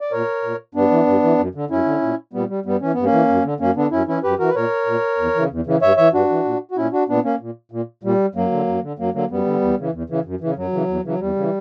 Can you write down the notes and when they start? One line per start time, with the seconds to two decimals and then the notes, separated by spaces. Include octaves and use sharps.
0.01 D5
0.12 A#2 A#4 C#5
0.43 A#2
0.75 G2 B3 D4
0.91 E3
1.07 G2
1.23 E3
1.38 F#2
1.55 D3
1.70 F#2 C#4 E4
1.85 D3
2.02 A#2
2.33 A#2 G3 B3
2.49 G3
2.65 G2 G3 B3
2.81 E3 C#4
2.93 G2 B3
3.03 A#3 C#4
3.12 E3
3.29 F#2
3.44 D3
3.60 F#2 A#3 C#4
3.76 D3 B3 D4
3.91 F#2 C#4 E4
4.07 E3 C#4 E4
4.23 F#2 G4 B4
4.39 E3 F#4 A#4
4.49 B4
4.55 A#2 A#4 C#5
4.86 A#2
5.18 E2
5.35 C#3 E3
5.51 E2
5.66 C#3 E3
5.82 G2 C#5 E5
5.97 E3 C#5 E5
6.13 G2 D4 F#4
6.30 E3
6.45 A#2
6.71 F#4
6.77 A#2 C#4 E4
6.92 D4 F#4
7.09 A#2 B3 D4
7.24 A#3 C#4
7.41 A#2
7.71 A#2
8.03 A#2 G3
8.35 F#2 F#3 A#3
8.52 D3
8.67 F#2
8.83 D3
8.99 F#2 F#3 A#3
9.14 D3 F#3 A#3
9.30 F#2 G3 B3
9.46 D3
9.61 E2
9.78 C#3 E3
9.93 E2
10.10 C#3 E3
10.25 F#2
10.40 C#3 E3
10.56 F#2 F#3
10.73 C#3 E3
10.88 E2
11.04 C#3 E3 F#3
11.20 E2 G3
11.36 C#3 E3